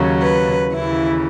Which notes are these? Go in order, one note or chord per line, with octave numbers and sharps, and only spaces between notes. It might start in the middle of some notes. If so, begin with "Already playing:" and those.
Already playing: D#2 C#3 F#3
B4
D#2 C#3 E3 E4